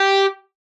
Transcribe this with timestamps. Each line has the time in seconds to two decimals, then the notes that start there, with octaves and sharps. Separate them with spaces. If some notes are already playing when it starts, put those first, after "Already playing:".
Already playing: G4